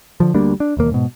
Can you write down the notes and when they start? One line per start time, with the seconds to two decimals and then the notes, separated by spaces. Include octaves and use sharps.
0.20 D3 F3
0.34 D2 G3 A#3 D4
0.60 D4
0.77 E1 D#2 A#3
0.91 G#2 B2